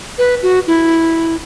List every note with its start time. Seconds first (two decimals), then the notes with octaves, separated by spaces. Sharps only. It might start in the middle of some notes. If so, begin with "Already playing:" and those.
0.18 B4
0.43 F#4
0.67 E4